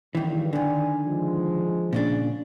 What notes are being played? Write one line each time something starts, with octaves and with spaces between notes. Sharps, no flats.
F#1 G2 D#3 E3
D3 D#3 D5 G#5
F3 G#3
A#2 C#3 D4